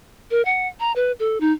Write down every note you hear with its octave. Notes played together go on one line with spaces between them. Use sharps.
A#4
F#5
A#5
B4
A4
D#4